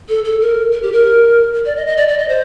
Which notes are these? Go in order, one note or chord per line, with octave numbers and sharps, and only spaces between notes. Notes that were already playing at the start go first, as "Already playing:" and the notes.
A4
A4
A#4
A#4
G4
A#4
D5
D#5
D#5
D5
D5
D#5
C5